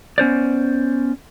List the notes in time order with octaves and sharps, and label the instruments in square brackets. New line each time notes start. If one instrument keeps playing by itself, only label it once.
[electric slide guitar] B3 C#4 C5 D5